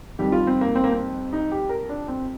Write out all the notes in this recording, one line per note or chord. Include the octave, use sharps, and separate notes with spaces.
F2 D#3 G3 G4
F4
C4
A#3
C4
A#3
C4
D#4
G4
A#4
D4
C4